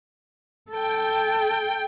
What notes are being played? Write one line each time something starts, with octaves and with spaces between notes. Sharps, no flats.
A4 G5